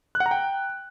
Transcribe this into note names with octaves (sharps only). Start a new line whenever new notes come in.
F#6
F#5
A#5
G5